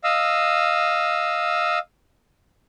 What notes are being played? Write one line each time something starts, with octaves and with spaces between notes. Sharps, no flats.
D#5 F5 E6